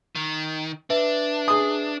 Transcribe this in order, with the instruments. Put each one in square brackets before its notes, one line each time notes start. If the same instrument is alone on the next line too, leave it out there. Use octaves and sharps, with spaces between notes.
[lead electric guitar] D#3
[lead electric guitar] D4 [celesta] B4 E5
[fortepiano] G#4 D#6